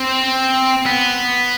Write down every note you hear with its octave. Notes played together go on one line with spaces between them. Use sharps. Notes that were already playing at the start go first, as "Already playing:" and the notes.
Already playing: C4
B3